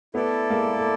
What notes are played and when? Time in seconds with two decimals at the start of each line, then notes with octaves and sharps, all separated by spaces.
0.14 A3 B3 E4 A4 D5
0.50 G#3 A#3
0.79 A3